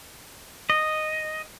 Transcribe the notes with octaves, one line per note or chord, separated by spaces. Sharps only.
D#5